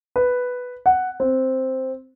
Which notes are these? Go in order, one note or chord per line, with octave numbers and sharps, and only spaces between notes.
B4
F#5
C4